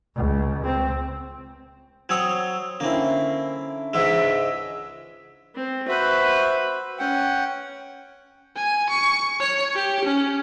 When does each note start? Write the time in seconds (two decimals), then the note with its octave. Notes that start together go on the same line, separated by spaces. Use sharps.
0.16 C#2
0.65 C4
2.09 F#3 C4 C#5 D#6 E6 G#6
2.80 D3 A#3 C4 C#4 E4
3.93 C#2 G#2 G#3 E5
5.55 C4
5.88 F#4 B4 C5 E5
6.99 C#4 F#5 G5
8.56 G#5
8.90 C#6
9.40 C#5
9.75 G4
10.05 C#4